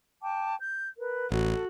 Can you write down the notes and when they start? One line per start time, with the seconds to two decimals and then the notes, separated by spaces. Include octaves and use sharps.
0.22 G5 A5 D6
0.60 G6
0.98 A#4 B4
1.31 A1 F#4 A4